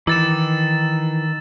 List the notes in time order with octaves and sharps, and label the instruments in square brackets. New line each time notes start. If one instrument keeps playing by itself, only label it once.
[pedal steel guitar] D#3 D#4 D6 [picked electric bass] E3 [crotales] E6 A6 E7